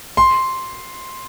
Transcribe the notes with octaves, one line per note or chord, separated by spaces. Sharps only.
C6